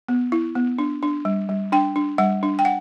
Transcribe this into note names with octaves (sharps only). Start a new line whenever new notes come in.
B3
E4
B3
D4
D4
G3
G3
D4 G5
D4
G3 F#5
D4
G5
F#5